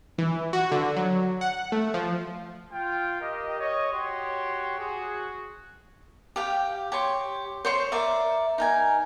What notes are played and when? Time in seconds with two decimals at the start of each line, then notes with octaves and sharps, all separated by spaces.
0.18 E3
0.53 F#4
0.72 D3
0.97 F#3
1.41 F#5
1.72 A3
1.94 F3
2.73 F4 G5
3.21 G4 A#4 D#5
3.59 C#5 D#5
3.92 F#4 G4 C#5 C6
4.79 F#4 G#4
6.36 G4 F5 G5
6.92 G4 C#5 C6
7.65 C5 C#5 C6
7.92 A#4 D5 E5
8.58 D#4 A#4 G#5